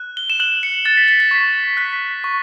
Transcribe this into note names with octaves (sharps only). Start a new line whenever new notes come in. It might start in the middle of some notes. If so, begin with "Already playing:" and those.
Already playing: F#6
G7
E7
F#6 F#7
C#7
F#6 A6
B6
A6
B6
C#6 A6
F#6 B6
C#6